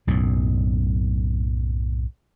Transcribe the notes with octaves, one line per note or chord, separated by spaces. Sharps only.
B1 F#2 A2